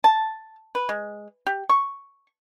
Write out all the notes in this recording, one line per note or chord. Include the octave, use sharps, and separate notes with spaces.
A5
B4
G#3
G4
C#6